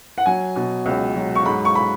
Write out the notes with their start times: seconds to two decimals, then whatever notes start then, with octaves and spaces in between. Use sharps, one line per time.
0.18 F#5
0.26 F#3 G#5
0.56 B2
0.86 C#2
1.16 F#3
1.35 C#6
1.46 G#2 B5
1.65 C#6
1.75 B5